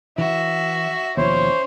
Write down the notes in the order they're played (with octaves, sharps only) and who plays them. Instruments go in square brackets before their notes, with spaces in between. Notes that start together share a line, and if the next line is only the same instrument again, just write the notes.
[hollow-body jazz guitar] E3 [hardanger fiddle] F#4 [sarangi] E5
[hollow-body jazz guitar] D#2 B2 F3 [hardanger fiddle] C#4 E4 [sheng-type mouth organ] C5 [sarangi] C#5